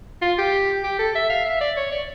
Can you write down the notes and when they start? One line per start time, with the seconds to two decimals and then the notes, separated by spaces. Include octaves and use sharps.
0.22 F4
0.38 G4
0.83 G4
0.99 A4
1.15 E5
1.30 F5
1.45 E5
1.61 D5
1.77 C#5
1.92 D5